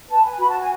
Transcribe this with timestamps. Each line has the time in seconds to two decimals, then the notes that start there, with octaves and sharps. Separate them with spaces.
0.08 B4 A5
0.24 G#5
0.39 F#4 B5
0.49 A5
0.59 G#5